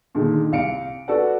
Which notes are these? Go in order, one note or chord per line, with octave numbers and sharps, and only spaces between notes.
A#2 D3 D#3 G#3
C2 F5 C#7 D7
F#4 A4 B4 D5 F#5